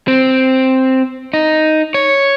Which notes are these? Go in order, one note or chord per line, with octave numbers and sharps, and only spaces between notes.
C4
D#4
C#5